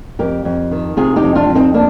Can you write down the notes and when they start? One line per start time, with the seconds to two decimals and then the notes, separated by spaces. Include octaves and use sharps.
0.19 F2 G4 A#4
0.45 F2
0.71 D#3
0.97 C3 F4 G#4
1.16 D#4 G4
1.23 F2
1.35 D4 F4
1.49 F2
1.55 C4 D#4
1.74 A#3 D4